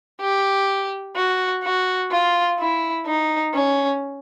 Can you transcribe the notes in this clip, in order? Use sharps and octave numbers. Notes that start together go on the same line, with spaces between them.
G4
F#4
F#4
F4
E4
D#4
C#4